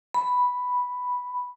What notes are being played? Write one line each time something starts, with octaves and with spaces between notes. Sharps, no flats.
B5